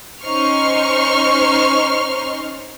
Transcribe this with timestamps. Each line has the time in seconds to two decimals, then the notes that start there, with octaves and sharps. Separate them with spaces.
0.23 C#4 D#4 C5 C6 C#6 F6